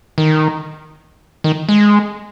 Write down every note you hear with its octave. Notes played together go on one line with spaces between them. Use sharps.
D#3
D#3
G#3